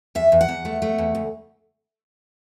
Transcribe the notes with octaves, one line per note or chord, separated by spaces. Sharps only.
E2 E5
E2
F#5
E2
A3
A3
E2
D2